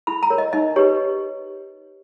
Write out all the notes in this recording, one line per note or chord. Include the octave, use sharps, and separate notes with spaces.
E4 B5
A#5
A#4 C#5
D#5
D#4 D#5
G4 B4 C#5